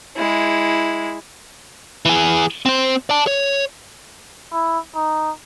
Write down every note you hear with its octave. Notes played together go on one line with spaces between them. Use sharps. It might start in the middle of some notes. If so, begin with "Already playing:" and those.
G#3 E4
E3 G#4
C4 C5
D5 A5
C#5
E4
D#4